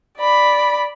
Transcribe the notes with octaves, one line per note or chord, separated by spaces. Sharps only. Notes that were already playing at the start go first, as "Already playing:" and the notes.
D5 B5